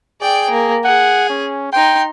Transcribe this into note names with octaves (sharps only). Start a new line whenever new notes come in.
G#4 D5 G5
A#3
G#4 F#5
C#4
D#4 G5 C6